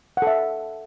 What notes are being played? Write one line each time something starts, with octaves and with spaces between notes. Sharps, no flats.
A4 E5 F#5